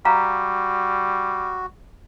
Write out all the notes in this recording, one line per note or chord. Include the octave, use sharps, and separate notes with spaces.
G3 F#4 F5 A#5